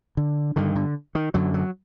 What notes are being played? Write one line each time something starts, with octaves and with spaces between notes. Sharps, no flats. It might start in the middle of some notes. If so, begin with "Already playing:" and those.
D3
G2 D3 D#3
D3
D#3
F#2 D3 F#3
F#3